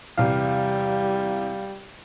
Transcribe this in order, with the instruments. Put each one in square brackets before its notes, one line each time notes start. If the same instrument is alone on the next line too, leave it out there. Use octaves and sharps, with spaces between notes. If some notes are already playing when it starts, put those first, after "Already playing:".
[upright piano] E2 C3 [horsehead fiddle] G3 [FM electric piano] F5